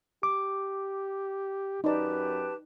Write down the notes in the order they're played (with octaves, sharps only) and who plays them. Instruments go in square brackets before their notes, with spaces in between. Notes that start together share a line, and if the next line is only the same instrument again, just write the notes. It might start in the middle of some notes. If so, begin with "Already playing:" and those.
[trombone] G4 [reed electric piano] D6
[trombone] F#2 [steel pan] D#4 D5 [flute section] G4 B4 A5